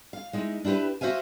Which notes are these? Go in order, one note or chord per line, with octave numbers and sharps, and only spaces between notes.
F5
G#3 D#4 E4
D4 E4 F#4 G4 B4
F#4 C5 E5 F5 G#5